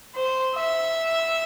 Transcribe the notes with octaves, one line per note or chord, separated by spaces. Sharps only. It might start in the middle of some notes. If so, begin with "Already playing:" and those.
C5
E5